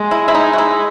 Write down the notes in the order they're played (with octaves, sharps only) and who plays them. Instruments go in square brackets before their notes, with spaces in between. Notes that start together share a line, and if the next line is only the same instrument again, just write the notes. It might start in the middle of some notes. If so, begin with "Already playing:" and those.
Already playing: [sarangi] G#3
[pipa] E4
E4
D#4
F#4
E4